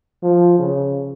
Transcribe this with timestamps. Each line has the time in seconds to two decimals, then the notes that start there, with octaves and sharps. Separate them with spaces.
0.23 F3
0.59 C#3